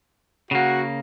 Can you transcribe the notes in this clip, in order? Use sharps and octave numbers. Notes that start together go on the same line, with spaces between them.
C#3 A#3 F#4